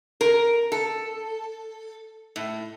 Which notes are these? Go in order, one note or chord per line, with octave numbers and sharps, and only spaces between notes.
A#4
A4
A2